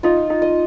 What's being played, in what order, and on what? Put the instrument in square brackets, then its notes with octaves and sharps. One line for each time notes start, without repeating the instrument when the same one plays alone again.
[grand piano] D#4 [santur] F4
[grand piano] D#4
[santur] D#5